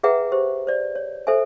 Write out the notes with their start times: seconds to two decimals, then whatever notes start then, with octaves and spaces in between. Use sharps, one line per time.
0.03 G#4 B4 E5 F#5 G5 A#5
0.32 G4 C5
0.67 C5 D5
0.95 C#5
1.27 A4 C5 E5 G#5